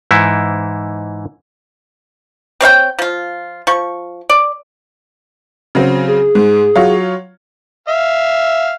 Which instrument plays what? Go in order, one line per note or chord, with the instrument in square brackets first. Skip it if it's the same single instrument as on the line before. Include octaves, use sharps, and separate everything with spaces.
[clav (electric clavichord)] G#2 E3 D#4 E4
[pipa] C4 C#5 F5 G5
F3 F4
F3 C#6
D5
[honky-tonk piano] C#3 F#3 C4
[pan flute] G#4
[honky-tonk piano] G#2
F#3 F4 C#5
[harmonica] E5 F5